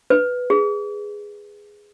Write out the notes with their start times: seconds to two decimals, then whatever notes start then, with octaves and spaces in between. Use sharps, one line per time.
0.10 B4
0.50 G#4